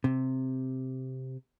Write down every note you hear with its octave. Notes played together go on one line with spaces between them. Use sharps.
C3